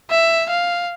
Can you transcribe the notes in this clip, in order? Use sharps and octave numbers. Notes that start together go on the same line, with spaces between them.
E5
F5